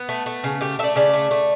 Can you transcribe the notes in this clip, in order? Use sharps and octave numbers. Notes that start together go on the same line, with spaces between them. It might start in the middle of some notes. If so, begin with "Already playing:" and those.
Already playing: B3
A3
A3
C#3
A3 G4
A3 D5 E5
C#3 D5
A3
A3